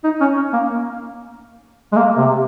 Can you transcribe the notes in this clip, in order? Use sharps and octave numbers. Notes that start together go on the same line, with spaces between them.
D#4
C#4
A#3
G#3
A#3
C3